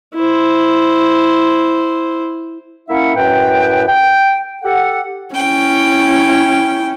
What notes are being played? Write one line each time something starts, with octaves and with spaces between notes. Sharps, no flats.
E4 C5
A#3 C#4 E4 E5 F#5
F#2 A2 B4 G5
G5
G4 A4 F#5
C#4 E4 G5